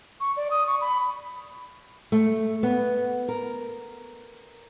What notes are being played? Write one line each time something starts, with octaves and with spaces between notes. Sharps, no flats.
C#6
D5
D#6
C#6
B5
A3
B3
A#4